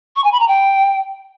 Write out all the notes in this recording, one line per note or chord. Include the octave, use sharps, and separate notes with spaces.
C#6
G#5
B5
A#5
G5